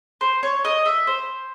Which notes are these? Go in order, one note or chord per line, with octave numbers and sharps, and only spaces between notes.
C5
C#5
D#5
E5
C5